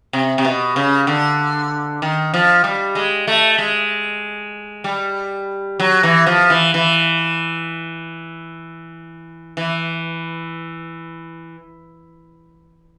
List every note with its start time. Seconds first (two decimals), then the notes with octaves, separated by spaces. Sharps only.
0.13 C3
0.38 C3
0.45 B2
0.76 C#3
1.07 D3
2.02 D#3
2.34 F3
2.64 G3
2.95 G#3
3.27 A3
3.58 G#3
4.84 G3
5.80 F#3
6.03 E3
6.27 F3
6.50 E3
6.74 E3
9.57 E3